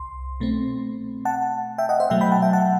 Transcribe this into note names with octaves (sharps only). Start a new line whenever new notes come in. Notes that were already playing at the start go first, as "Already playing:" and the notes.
Already playing: C2 C6
B2 A3 C4
F#5 A5
E5 G5
D#5 F#5
C5 E5
B2 F#3 A3 E5 G5
G5 B5
F#5 A5
E5 G5
F#5 A5